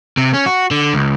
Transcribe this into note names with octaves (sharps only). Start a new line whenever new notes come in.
C3
C#4
F#4
D3
C#2